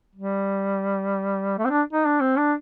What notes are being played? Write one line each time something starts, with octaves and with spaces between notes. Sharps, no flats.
G3
A3
C4
D4
D#4
D4
C4
D4